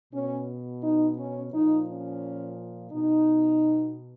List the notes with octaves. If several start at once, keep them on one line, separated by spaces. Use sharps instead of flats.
B2 C#4
D#4
C#4
A#2 F3 D#4
C#4
B2 D#4